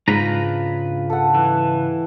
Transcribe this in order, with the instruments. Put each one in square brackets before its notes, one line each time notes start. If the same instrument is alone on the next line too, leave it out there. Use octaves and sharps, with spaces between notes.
[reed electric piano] G#2 [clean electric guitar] C#3 B4 A#5 [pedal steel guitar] D4 F4 B5
[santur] A4 F#5
[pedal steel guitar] E3